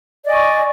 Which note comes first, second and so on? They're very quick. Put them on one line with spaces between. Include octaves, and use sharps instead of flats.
D5 D#5 G#5 C#6